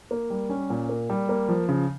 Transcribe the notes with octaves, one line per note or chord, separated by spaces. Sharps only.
A#3
G3
C#4
A#2
A#3
G3
A#3
F3
C#3